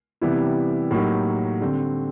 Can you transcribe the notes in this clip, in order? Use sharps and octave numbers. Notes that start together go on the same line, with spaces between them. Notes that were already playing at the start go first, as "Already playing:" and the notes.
C3 E3 G3 B3 E4
A2 F#3 A#3 D#4 G4
D3 G3 C4